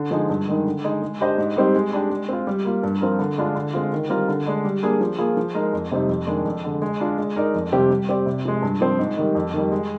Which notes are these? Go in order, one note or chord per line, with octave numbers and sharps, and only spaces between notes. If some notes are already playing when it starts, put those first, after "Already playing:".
Already playing: D3
F3 G#3 D#4 G#4
G2
D#3 G#3 D#4
D3
G#3 D#4
G#3
D4 G4 C5 D#5
G#2
G3 C4 D#4 G4
G#3
D4 G4
G#3
C4 F4
G3
A#3 F4
G2
F3 C4 F4 A#4
D3
G#3 D4 F4
D3
G#3 C4 F4
D#3
G3 C4 F4 A#4
D3
G#3 D4
G3
A#3 D4 G#4
F3
A#3 F4 G#4
F3
G#3 D#4 A#4
F2
C3 G3 C4 D#4
F2
D#3 G#3 D4
F2
D3 G#3
G#3
D4 F4
G#3
D#4 A#4 D5
F2
C3 G3 C4 G4
G3
C4 G4 D5
C3
F3 G#3
G2
F3 C4
G#2
D#3 G3
F2
D#3 G3
G#3